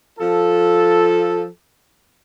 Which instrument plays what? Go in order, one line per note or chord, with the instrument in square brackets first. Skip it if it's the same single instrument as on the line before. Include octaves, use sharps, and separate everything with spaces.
[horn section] F3 F4 A4